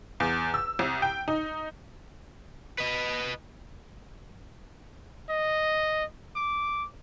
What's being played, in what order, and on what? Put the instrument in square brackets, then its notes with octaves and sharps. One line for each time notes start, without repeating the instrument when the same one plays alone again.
[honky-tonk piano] E2
E6
C2
G5
D#4
[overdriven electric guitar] B4 D#5
[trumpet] D#5
D6